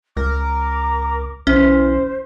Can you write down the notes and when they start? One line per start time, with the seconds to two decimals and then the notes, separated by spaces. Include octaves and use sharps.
0.17 C#2 A#4 D6
1.47 B1 E3 C#4 C5